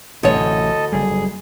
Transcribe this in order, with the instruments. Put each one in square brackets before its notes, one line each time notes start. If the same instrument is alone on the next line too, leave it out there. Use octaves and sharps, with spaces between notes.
[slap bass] A1 A2 C3 [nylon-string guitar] D2 C#5 [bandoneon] A4 D#5
[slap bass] F#1 G3 [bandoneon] G#4